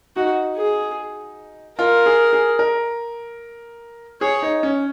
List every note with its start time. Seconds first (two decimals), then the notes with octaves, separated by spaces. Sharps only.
0.16 D#4 F#4
0.57 G#4
1.78 F4 A#4
2.06 G#4
2.33 G#4
2.59 A#4
4.21 G#4 C#5
4.42 D#4
4.63 C#4